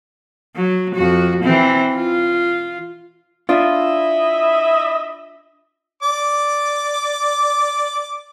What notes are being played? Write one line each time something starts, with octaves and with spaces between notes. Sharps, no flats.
F#3
F2 F#4
E3 C4
F4
D4 E4 F4 D#5 E5
D5 D6